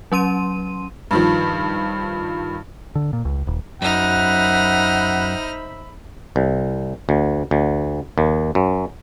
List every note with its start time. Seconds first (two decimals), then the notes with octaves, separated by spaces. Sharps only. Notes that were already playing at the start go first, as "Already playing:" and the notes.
0.12 F#3 C#4 C6 D#7
1.11 G2 D#3 F3
2.95 D3
3.13 A#2
3.25 C#2
3.47 D#1
3.82 F#2 D#4 C5 E5 F#5 B5 F6
6.36 C2
7.09 D2
7.51 D2
8.18 D#2
8.55 F#2